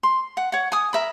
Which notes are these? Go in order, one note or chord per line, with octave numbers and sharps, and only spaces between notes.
C6
F#5
C#5 F#5
G#5 D#6
A#4 E5 B5